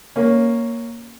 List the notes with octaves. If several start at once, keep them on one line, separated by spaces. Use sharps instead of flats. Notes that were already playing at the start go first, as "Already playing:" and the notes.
A#3 C#4